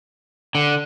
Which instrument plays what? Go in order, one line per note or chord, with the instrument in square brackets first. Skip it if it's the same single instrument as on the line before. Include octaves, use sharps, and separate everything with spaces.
[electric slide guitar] D3